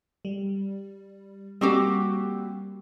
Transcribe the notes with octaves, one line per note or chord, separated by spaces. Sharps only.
G3
G3 A#3 C4 F#4 G4